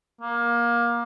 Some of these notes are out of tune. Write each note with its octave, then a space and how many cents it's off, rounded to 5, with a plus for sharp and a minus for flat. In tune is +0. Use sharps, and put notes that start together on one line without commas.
A#3 +20